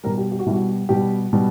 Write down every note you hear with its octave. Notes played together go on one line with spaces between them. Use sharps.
B2 G3 A#4
G4
G4
F#4
B2 G3 E4
F#4
B2 G3 G4
B2 G3